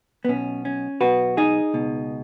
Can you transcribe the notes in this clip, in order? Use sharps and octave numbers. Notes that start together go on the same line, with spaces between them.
B3
B1 B2 C#4
C#4
B1 B2 F#4 B4
D#4 G#4
C#2 B2